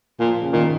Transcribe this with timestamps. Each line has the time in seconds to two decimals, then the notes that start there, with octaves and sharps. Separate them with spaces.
0.20 A#2 F3
0.42 C#3
0.53 A#2 D#3